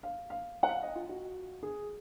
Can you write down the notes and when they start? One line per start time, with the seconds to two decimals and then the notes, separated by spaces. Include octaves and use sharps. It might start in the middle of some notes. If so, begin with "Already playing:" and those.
0.03 F5
0.30 F5
0.63 F#5
0.69 F5
0.83 D#5
0.95 F4
1.09 F#4
1.63 G#4